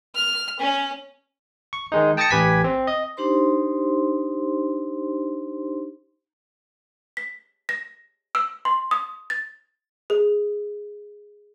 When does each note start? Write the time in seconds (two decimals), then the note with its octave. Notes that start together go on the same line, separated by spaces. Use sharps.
0.15 F6
0.60 C#4
1.73 C#6
1.92 D#3 G#3 D#4
2.17 G5 A5 D#6 A6 A#6 C#7
2.30 A1 G4 B4 G#5 G#6 B6
2.64 C4
2.87 D#5
3.17 D4 D#4 G4 C5 C6
7.17 B6
7.69 A#6
8.35 E6
8.65 C6
8.91 D#6
9.30 A6
10.10 G#4